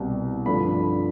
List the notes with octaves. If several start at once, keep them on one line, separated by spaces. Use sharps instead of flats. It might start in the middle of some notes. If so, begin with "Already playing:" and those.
Already playing: C2 B2 G3 C4
G2 D3 F3 A3 D4 B5